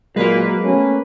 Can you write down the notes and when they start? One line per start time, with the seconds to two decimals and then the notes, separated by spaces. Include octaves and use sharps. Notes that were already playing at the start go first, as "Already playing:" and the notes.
0.16 A#2 F#3 G#3 A#3 B4
0.64 A3 B3 C#4